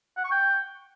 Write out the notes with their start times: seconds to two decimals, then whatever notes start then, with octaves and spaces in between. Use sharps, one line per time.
0.17 F#5
0.24 C#6
0.32 G5